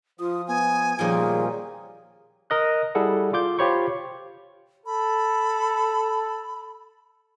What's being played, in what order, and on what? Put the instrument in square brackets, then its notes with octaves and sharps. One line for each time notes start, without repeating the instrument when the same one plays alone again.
[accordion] F3 D#6 [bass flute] F4
[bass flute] B3 [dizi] G#5
[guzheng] A#2 D#3 F3 [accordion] G3 C#4 F4 [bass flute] G#4
[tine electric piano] A#4 D#5 F#6
G3 E4 G#4 A4 F#5
F4 D6 G6
F4 G4 C5 C#5 B5 C#6
[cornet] A4 [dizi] B5